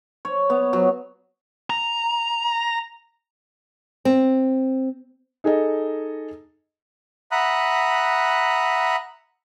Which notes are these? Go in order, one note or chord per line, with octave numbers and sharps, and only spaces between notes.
C#5
B3
F#3
A#5
C4
D#4 G#4 A4 D#5
E5 F#5 A#5 B5 D#6 F#6